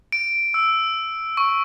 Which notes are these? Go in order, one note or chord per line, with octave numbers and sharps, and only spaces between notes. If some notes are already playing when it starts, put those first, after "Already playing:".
D7
E6
C#6